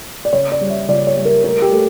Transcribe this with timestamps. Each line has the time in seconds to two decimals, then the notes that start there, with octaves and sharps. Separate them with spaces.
0.25 D5
0.33 C#3 C#5
0.52 D5
0.61 G3
0.70 E5
0.88 C#2 D5
1.07 C#5
1.16 G3
1.25 A#4
1.44 A3 A#4
1.62 G4
1.72 A3